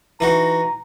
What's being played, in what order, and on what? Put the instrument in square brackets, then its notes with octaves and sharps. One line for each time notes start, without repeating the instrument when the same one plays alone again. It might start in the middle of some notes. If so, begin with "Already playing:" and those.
[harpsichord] E3 D#4 F#4 [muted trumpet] A#5